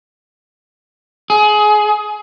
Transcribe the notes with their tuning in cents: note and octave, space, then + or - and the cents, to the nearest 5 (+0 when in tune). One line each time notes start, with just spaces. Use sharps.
G#4 +25